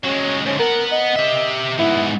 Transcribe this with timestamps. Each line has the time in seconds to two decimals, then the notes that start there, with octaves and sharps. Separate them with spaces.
0.05 F#3 G#3 C#4
0.46 G#2 D3 C#4
0.59 B3 A#4 F#5
0.91 D#5
1.16 G4 E5
1.79 G#2 B3 E4